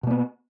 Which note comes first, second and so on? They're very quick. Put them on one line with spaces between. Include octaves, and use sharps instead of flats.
B2 A#3 B3